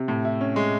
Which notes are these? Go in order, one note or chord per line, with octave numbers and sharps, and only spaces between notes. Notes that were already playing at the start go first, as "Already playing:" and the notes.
Already playing: C3
A2
E4
C#4
G#3